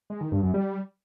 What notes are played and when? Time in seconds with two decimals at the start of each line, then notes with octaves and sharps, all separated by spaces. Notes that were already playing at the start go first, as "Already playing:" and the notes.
0.10 G#3
0.21 D#3
0.32 G2
0.43 F#2
0.54 G3